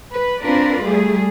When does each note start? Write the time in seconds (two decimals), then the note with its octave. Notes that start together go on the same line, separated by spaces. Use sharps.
0.10 B4
0.40 C4 D4 F4 A#4 B4 D5
0.82 G3 A3 G#4